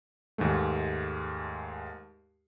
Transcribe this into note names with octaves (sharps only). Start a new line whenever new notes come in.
D#2 G#2 G#3 A3